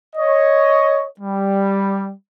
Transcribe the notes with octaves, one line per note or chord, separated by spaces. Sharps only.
C#5 D#5
G3